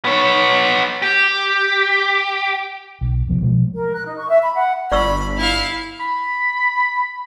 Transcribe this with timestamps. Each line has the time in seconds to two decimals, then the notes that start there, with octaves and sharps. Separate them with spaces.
0.05 B3 C#5
1.02 G4
3.01 B1
3.27 E1 C3 F3 B3
3.42 B2 F3 G#3 A3
3.76 A#4
3.93 F#6
4.06 D#4
4.17 C#6
4.29 E5
4.42 B5
4.55 F#5
4.92 G1 D5 B5 C#6 E6
5.37 E4 F5
6.00 B5